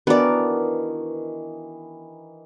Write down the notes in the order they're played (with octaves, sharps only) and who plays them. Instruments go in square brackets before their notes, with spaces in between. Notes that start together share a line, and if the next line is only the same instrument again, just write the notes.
[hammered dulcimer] D#3 E3 [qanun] B3 D5 [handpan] D4 F#4 A#4